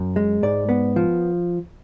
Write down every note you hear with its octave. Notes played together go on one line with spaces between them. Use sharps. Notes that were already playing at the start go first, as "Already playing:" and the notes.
Already playing: F#2
G#3
G#2 D5
B3
F3